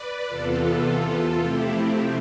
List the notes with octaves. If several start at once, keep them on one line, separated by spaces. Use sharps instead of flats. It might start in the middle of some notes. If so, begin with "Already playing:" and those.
Already playing: B4 D5
E2 C3 E3 B3 F4 A4
C3 F3 A3 C4 E4 G4